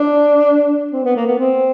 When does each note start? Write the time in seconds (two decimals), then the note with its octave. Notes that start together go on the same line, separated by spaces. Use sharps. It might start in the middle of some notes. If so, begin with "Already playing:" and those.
Already playing: D4
0.93 C4
1.04 B3
1.16 A#3
1.26 B3
1.38 C4